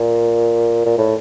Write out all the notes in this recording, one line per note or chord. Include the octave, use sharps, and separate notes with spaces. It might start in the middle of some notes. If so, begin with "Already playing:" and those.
Already playing: A#2
A#2
A2